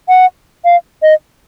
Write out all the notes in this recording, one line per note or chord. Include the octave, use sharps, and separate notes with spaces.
F#5
F5
D#5